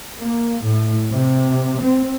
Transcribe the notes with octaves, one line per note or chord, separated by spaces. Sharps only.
A#3
A2
C3
C4